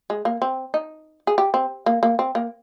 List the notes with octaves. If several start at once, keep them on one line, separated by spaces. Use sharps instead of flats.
G#3
A#3
C4
D#4
G#4
G4
C4
A#3
A#3
C4
A#3